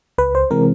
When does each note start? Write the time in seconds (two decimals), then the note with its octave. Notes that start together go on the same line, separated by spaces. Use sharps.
0.18 C#2 B4
0.35 C5
0.51 C3 E3 G#3 C4 A#4